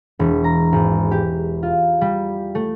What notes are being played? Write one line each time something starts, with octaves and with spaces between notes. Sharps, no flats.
E1
A#5
G#1
G4
F4
G3
A3